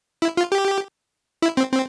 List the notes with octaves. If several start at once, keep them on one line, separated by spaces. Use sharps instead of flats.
E4
F4
G4
E4
C4
C4